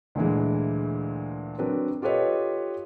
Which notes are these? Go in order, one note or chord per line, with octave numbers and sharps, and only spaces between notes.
D2 A#2 E3 G#3
F#3 C4 D4 A#4 B4
F4 G4 A4 B4 C#5 D#5